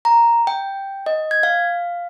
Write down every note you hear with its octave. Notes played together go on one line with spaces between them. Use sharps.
A#5
G5
D#5
G#6
F5